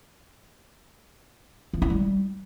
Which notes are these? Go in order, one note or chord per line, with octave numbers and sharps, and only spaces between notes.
E3
E4
G3